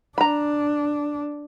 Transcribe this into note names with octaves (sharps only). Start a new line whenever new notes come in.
D4 A#5 B5